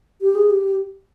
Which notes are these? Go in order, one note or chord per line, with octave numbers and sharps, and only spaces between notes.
G4
G#4
G4